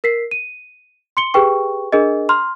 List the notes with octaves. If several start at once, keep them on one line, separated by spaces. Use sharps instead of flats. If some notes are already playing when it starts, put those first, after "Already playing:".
A#4 B6 C7
D#7
C6 C#7 G7
G4 G#4 B4 G5 C#6
D4 G#4 A#4 D#5
A#5 C6 F6